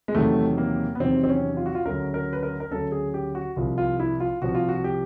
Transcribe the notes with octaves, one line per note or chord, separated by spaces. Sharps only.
G#3
E2 C3 D#3 F#3 A3
A#3
B3
E2 C3 D#3 F#3 C4
C4
C#4
F4
F#4
F4
D2 C#3 F#3 A#4
A#4
B4
A#4
A#4
D2 C#3 F#3 A4
G#4
G4
F#4
C2 C3 F3 F4
F4
E4
F4
C2 C3 F3 F#4
F4
F#4
G4